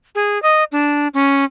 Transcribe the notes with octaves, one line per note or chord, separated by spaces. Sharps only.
G#4
D#5
D4
C#4